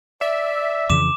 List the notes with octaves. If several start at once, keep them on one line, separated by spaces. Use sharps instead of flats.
D5 E5
F2 C#3 E3 D6 E7